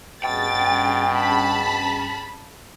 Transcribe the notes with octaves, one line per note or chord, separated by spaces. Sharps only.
G2 B2 C#4 G#4 G5 A6
A5 B5